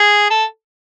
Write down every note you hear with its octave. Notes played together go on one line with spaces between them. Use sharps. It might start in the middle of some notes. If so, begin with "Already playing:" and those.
Already playing: G#4
A4